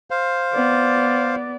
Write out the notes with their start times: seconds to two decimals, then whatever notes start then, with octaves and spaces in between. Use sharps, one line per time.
0.11 C5 F5
0.54 B3 D5